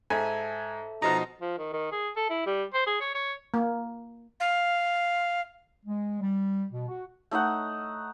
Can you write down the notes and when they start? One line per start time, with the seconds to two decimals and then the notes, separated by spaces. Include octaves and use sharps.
0.10 G#2 A4 E5 G#5 A5
1.02 B2 F3 D#4 A#5
1.41 F3
1.58 D#3
1.73 D#3
1.92 G#4
2.16 A4
2.30 E4
2.46 G3
2.74 C5
2.87 G#4
3.01 C#5
3.15 C#5
3.54 A#3
4.40 F5
5.86 G#3
6.19 G3
6.71 B2
6.88 F#4
7.31 A3 D#4 D#5 F#5